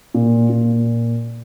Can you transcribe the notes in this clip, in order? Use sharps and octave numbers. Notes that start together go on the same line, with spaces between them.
A#2
A#2